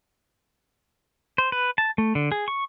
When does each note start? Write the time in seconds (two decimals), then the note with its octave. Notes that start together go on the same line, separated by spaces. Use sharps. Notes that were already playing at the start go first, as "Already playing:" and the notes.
1.38 C5
1.52 B4
1.78 A5
1.98 A3
2.15 D3
2.32 G#4
2.48 C#6